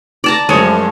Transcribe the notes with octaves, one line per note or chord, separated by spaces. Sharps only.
D5 A5 A#5
F#2 F3 G#3 A3 C#5